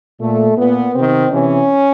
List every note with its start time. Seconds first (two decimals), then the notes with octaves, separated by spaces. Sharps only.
0.20 A#2 A3
0.57 A#2 B3
0.94 C3 D#3 C4
1.31 C3 E3 C#4